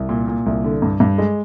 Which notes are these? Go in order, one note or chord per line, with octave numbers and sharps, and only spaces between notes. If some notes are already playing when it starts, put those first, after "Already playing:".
Already playing: C2
A#2
A#2
C2
D3
G2
G2
G#3